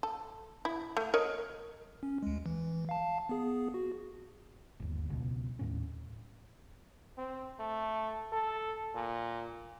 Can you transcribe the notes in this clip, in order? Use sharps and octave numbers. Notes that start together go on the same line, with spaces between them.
A4
E4
A3
A#4 C#5 D#5
C#4
D2 G#3
E3
F5 A5
B3 G#4
F#4
G1 D#2
C#2 B2
D#2 A2 C#4
C4
A3
A4
A#2